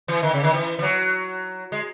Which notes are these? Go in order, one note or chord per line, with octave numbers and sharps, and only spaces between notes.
E3
D#3
C#3
D#3
E3
E3
F#3
G#3